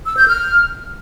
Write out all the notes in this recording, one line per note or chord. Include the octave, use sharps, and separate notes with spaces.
E6
G6
F6